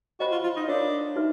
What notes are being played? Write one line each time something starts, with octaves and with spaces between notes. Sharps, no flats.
F#4 C5 D#5 F#5 B5
F4
F4
D#4
D4 A#4 C#5 F5
D#4 F#4 B4 E5